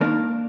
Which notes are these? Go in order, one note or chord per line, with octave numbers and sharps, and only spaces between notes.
D#2 D#3 A#3 D4